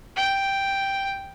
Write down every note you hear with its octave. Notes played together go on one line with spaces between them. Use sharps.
G5